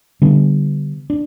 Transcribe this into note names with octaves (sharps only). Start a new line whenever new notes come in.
D3 G3 B3
D4